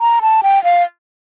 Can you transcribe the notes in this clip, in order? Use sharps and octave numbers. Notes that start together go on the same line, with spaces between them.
A#5
A5
G5
F5